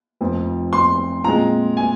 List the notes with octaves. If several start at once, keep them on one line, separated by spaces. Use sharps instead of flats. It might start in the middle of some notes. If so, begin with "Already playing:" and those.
F1 F2 F3
C6
A#2 G#3 C4 F4 A#5
G#5